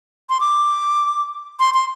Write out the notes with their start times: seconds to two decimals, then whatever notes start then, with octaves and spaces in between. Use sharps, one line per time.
0.30 C6
0.40 D6
1.60 C6
1.74 C6